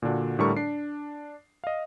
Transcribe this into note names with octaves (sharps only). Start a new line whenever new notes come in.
A#2 D3 D4 F#4
A2 D3 G3 A4 A#4 C#6
D4 C7
D#5 F5